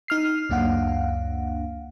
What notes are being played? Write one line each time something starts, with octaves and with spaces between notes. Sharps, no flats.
D#4 F6 C7
C#2 F#2 A#3 D4 F5 F#5